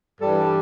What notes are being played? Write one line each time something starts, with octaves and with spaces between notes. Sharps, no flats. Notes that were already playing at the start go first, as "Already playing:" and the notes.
G2 E3 G3 A4